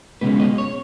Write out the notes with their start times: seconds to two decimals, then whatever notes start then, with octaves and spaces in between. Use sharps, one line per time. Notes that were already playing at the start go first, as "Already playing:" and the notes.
0.21 C#2 B2 G#3 C#4 B4
0.40 D#5
0.58 C#5